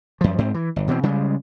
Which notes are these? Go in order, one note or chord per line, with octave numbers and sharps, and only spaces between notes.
F#2 F3
G#2 C4
E3
G1
B2 E3 G#3 C4
C#3 G3 G#3